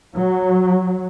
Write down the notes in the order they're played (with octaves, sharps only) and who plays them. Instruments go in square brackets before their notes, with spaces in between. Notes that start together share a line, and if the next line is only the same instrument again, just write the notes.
[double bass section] F#3